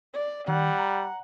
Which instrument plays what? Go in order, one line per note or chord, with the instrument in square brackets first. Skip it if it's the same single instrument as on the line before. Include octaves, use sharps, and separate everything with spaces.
[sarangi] D5
[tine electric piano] D#3 [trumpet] G3 [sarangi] F#5
[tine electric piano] A#5